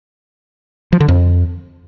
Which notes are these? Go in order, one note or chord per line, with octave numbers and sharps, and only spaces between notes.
F3
D3
F2